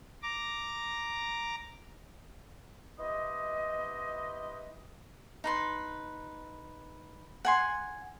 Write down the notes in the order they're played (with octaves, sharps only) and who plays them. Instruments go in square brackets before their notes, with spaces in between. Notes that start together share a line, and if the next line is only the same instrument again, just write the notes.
[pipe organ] A#5 D6
[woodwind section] B3 E4 G4 B4 C5 D#5
[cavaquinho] D#4 B4 C6
F#5 G#5 C6